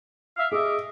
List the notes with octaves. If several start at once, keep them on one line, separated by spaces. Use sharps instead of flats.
E5 F5
G#4 D#5 E5 D6